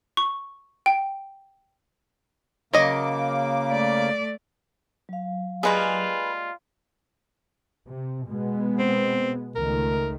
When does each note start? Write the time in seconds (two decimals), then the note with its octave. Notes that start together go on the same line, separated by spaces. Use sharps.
0.17 C#6
0.86 G5
2.74 C#3 F#3 A#3 D#5 D6
3.69 A3 D5
5.09 F#3 F5
5.63 G3 G#3 A#3 F4 G#4 B4
7.85 C3
8.27 B2 G#3 B3
8.79 C4
9.56 C#2 D#3 A3 A#4